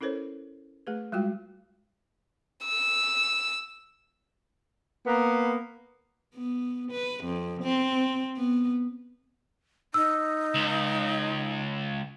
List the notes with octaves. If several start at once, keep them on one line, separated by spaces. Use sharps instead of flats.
C#4 E4 A4 A#4 C5 C#5
A3 G#4 B4
G3 G#3 F4 F#4 G5
E6
A#3 B3
B3
B4
F2
C4
B3
D#4 E6
C#2